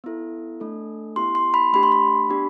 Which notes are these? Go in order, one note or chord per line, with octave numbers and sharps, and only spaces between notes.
B3 E4 A4
A3 D4 A4
B3 E4 G4 C6
C6
B5
A3 D4 G4 B5
C6
B5
B3 D4 G4